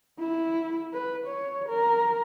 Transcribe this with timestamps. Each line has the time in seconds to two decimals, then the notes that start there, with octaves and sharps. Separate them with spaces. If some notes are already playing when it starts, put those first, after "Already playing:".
0.20 E4
0.93 B4
1.27 C#5
1.69 A#4